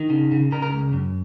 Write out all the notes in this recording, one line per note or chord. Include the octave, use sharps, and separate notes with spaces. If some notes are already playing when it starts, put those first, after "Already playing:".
Already playing: D#3
C#3
C#3
C#3 A#4
A#4
C#2
F#2